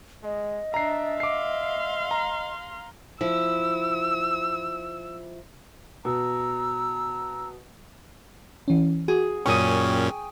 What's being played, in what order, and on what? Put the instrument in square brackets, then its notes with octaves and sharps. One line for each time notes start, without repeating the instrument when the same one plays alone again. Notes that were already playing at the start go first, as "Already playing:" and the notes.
[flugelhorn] G#3 [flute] D#5
[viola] D4 [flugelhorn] E5 [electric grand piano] A#5 C7
[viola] F5 C6 [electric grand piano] D6 C7
[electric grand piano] A#5
[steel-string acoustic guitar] F3 E4 [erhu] E6
[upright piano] B2 [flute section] A#5 E6
[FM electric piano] E3 C#4
[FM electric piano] F#4 [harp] G#4
[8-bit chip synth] F#2 A#2 C#4 [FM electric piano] G5 G#5 [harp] C#6 D#6